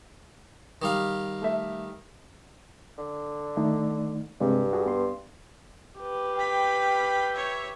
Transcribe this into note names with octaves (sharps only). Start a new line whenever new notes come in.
D#3 G3 F5
A3 E5
D3
D#3 A3 D#4
G2 C3 G#3 D4
F#4 G#4
B3 C6
G4 B4
F5 G5 B5
C#5 E5